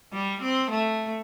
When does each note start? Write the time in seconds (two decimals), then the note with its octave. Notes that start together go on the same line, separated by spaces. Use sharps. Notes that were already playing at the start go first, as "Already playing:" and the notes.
0.13 G3
0.42 C4
0.71 A3